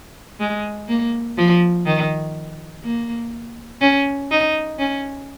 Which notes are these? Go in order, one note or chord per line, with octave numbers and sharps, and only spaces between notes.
G#3
A#3
F3
D#3
A#3
C#4
D#4
C#4